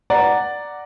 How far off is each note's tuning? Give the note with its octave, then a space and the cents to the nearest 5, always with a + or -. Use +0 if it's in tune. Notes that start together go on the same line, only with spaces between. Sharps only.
D5 +0 F#5 +0 A#5 +0